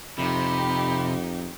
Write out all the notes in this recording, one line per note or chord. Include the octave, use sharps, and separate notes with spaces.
F2 C3 D#4 G4 B5